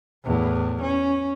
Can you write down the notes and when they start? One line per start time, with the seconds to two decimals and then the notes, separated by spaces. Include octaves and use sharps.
0.24 E2 A2
0.82 C#4